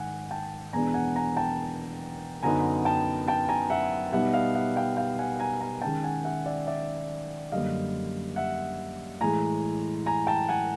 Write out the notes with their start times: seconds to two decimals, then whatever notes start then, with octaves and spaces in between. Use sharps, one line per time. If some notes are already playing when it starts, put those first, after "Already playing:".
Already playing: G#2 D#3 F#5 G#5
0.31 G5 A5
0.73 E2 B2 G#3 B3 D4 G#5 A#5
0.94 F#5 G#5
1.16 G#5 A#5
1.37 G5 A5
2.43 F#2 D3 F#3 B3 D#4 G#5 A#5
2.85 G5 A5
3.28 G5 A5
3.49 G#5 A#5
3.70 E5 F#5
4.12 B2 G3 B3 D#4 E5 F#5
4.33 D#5 F5
4.55 E5 F#5
4.76 F5 G5
4.97 F5 G5
5.19 F#5 G#5
5.39 G#5 A#5
5.61 G#5 A#5
5.82 D#3 G#3 C#4 G5 A5
6.04 F#5 G#5
6.24 E5 F#5
6.46 D5 E5
6.67 D5 E5
7.52 F#2 D3 G3 A#3 D#5 F5
8.36 E5 F#5
9.21 A2 E3 G#3 G#5 A#5
10.06 G#5 A#5
10.27 G5 A5
10.48 F#5 G#5